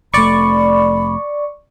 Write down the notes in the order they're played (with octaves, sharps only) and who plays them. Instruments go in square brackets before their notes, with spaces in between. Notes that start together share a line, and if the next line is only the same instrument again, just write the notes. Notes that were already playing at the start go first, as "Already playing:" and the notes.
[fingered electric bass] F1 A3 [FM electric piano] D5 C#6 [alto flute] B5